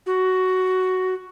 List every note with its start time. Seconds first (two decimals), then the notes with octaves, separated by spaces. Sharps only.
0.06 F#4